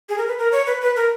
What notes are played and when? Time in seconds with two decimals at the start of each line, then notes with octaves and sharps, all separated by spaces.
0.09 G#4
0.18 A#4
0.27 B4
0.38 A#4
0.52 C#5
0.67 B4
0.81 B4
0.96 A#4